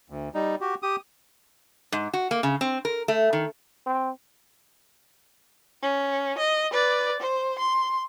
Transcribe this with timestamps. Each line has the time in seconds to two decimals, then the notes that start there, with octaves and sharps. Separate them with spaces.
0.10 D2
0.34 G3 D#4
0.61 F#4 G4
0.83 G4 D#6
1.92 G#2
2.13 F#4
2.31 A#3
2.43 C#3
2.61 C4
2.85 A#4
3.08 A3
3.33 D#3
3.86 C4
5.82 C#4
6.38 D#5
6.71 B4 D5
7.20 C5
7.59 C6